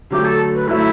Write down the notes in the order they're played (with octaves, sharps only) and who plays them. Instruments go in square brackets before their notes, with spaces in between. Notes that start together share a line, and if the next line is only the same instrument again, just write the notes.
[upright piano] D3 F#3 A3 [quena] G4
[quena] A4
B4
[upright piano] D3 F#3 A3 [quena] E4